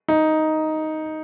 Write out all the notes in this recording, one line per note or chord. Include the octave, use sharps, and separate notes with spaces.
D#4